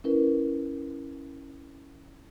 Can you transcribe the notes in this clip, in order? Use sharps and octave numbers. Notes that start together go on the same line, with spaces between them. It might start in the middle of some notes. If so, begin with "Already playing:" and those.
C#4 E4 A#4 B4